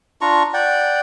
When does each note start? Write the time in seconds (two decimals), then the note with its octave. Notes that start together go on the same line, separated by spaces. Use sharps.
0.21 D4 F4 A#5 C#6
0.54 D5 F#5 G5